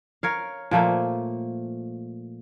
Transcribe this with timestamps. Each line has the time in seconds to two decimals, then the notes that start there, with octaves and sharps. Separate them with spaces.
0.23 A#4 C#5 F5
0.71 A#2 F3 A3 A#3